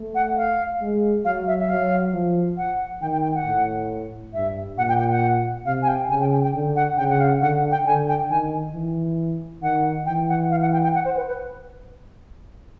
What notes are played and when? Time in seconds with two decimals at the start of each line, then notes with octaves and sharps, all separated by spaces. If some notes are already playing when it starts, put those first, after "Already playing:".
Already playing: A3
0.15 F#5
0.37 F5
0.81 G#3
1.25 F#3 F5
1.47 E5
1.59 E5
1.69 F#3 F5
2.14 F3
2.58 F#5
3.02 D#3 G5
3.12 G5
3.23 G5
3.35 F#5
3.46 A2
4.34 G2 E5
4.78 A#2 F#5
4.89 G5
4.99 G5
5.11 F#5
5.66 C3 F5
5.82 G#5
5.88 G5
6.10 C#3 G#5
6.21 G5
6.32 G5
6.43 G5
6.54 D3
6.76 F#5
6.97 C#3 G5
7.09 F#5
7.20 F5
7.42 D3 F#5
7.71 G5
7.86 D3 G#5
8.08 G5
8.30 D#3 G#5
8.74 E3
9.62 D#3 F#5
10.06 E3 G5
10.29 F#5
10.51 F5
10.61 F#5
10.73 G5
10.83 G5
10.95 F#5
11.05 C5
11.17 B4
11.28 B4